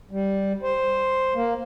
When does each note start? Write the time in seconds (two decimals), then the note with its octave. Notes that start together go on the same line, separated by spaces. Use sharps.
0.11 G3
0.63 C5
1.35 A#3